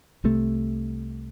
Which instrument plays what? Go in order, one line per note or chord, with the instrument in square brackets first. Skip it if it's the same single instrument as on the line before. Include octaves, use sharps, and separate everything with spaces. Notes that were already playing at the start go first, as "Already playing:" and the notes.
[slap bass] C2 C3 A3